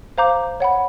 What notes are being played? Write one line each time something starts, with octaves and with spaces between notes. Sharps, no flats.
C5 F5 A#5 D6 G6
C#5 F#5 B5